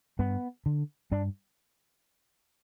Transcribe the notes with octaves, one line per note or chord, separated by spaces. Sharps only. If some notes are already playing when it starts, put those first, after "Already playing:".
G2 B3
D3
G2 D4